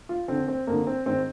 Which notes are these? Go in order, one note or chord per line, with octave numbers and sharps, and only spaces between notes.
F4
F2 D3 C4
C4
F2 D3 A#3
C4
G#2 D#3 C4